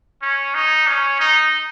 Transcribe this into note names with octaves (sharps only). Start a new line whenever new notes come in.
C#4
D#4
C#4
D#4